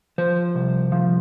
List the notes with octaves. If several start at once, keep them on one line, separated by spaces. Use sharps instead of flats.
F3 C5
C2
F3